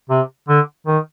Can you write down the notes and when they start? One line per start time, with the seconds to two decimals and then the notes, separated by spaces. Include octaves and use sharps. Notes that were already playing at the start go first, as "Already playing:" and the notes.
0.09 C3
0.48 D3
0.87 D#3